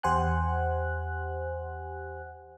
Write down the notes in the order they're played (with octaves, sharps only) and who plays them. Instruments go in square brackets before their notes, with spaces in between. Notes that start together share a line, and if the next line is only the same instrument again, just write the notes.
[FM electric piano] E2 G4 C5 F#5 G#5 F#6